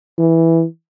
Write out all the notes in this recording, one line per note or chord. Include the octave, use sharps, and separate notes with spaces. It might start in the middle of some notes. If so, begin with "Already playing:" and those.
E3